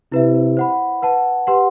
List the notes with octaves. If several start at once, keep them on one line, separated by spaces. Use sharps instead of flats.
C3 E4 B4 E5
C5 F#5 B5
B4 F#5 A5
G4 B4 F#5 C6